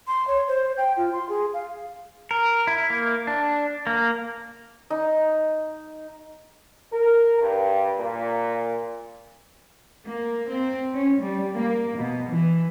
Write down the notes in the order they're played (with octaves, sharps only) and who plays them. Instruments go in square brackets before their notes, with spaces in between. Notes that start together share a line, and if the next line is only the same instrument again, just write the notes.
[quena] C6
C#5
C5
G5
F4
C6
G#4
F5
[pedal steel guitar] A#4
E4
A#3
D4
A#3
[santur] D#4
[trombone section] A#4
G2
A#2
[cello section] A#3
C4
C#4
G3
A#3
B2
E3